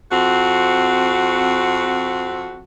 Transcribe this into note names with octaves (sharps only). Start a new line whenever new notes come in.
F2 C4 F#4